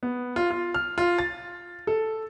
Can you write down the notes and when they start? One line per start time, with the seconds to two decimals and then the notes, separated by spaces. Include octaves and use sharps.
0.03 B3
0.36 F4
0.51 F4
0.74 F6
0.98 F4
1.18 A6
1.87 A4